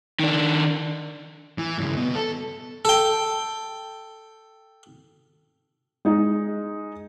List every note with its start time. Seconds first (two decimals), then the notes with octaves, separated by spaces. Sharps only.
0.20 D#3 D4
1.58 E3
1.78 G2 C#3
1.97 B2
2.15 A4
2.85 A4 G5
6.05 G#3 D#4